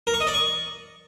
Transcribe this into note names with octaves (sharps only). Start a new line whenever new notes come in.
A#4
C#6
D#5
D5
C#6